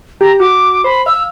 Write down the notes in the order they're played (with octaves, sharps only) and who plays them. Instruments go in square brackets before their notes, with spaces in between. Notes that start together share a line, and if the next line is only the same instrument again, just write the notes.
[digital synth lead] G4 [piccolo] A#5
[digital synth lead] F#4 [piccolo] D6
[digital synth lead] C5 [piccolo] B5
[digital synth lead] F5 [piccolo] E6